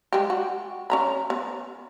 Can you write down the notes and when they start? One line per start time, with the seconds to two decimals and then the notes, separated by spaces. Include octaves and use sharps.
0.12 G3 G#3 G4
0.30 F#4
0.90 C#4 A#5 B5
1.30 B3